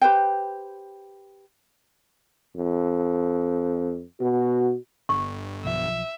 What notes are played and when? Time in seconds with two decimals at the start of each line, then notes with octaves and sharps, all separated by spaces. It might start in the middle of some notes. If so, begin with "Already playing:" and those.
0.01 G4 B4 C5 G5
2.56 F2
4.21 B2 F#4
5.09 G1 C#6
5.64 B1 F3 E5